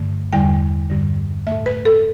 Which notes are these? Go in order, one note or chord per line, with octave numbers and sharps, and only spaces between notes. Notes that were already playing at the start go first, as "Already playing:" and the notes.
Already playing: G2 D3 A3
E2 D3 G3 G5
G2 D3 G3
A2 A3 E5
B4
A4